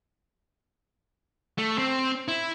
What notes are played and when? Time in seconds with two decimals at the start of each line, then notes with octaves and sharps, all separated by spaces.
1.58 A3
1.78 C4
2.28 E4